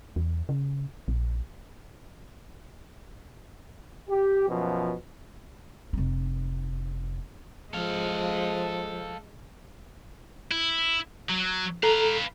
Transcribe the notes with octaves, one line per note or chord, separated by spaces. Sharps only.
E2
C#3
A#1
G4
F#2 B2 F3
F1 D#4
F3 G#3 A4 F5
E4
F#3
A4 B4 F5 A#5